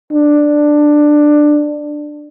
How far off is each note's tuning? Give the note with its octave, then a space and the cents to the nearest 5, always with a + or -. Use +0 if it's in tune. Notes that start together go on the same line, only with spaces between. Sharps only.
D4 +10